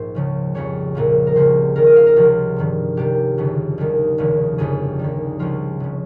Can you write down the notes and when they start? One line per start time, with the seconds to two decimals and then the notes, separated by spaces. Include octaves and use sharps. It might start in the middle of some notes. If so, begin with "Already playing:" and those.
Already playing: A#1 G#2 C5
0.15 C#2 C#3 F3
0.54 F2 C#3 G3 C#5
0.95 A#1 A#2 F3
1.27 A#4
1.36 C#2 C#3 G3 C5
1.76 D#2 D#3 G3 A#4
1.86 D#5
1.96 F5
2.06 A#4
2.16 C#2 C3 F3 F4
2.56 G1 G2 D#3 G3
2.97 C#2 C3 D#3 G3 G4
3.38 G1 F2 C#3
3.78 D#2 D#3 G3
4.18 F1 D#2 C#3 F3
4.58 G1 F2 C#3 G3 G#4
4.99 D#2 D#3 G3
5.39 C#2 C#3 F3 F4
5.80 F1 C#3